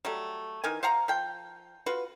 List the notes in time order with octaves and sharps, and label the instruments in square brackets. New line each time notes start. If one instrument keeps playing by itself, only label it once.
[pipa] F#3 G3 A3
D#3 E3 G#5
C5 F5 F#5 A#5
F3 G5
F4 F#4 B4